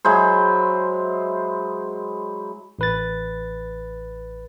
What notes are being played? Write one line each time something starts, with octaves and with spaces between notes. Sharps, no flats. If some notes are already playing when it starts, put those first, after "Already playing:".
F#3 G#3 E4 C5
A1 B4 A6